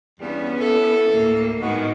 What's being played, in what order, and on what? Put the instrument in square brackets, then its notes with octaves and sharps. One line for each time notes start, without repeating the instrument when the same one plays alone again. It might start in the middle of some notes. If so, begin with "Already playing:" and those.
[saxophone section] E2 G2 G3 [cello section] B3 C#4
[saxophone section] E4 A4
[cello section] D2 A2 A#3
[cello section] A2 D#3 G#3 [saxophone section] B3 F#4